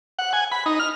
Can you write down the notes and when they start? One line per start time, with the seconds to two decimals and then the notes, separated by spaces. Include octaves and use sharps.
0.19 F#5
0.33 G#5
0.52 B5
0.66 D#4
0.80 F6